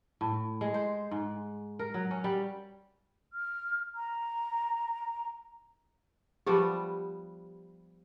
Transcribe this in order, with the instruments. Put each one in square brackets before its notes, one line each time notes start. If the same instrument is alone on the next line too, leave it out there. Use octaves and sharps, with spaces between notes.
[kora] A2
G#3
C5
G#2
A#4
F#3
C#4
G3
[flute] F6
A#5
[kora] F3 G3 B3 [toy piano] G4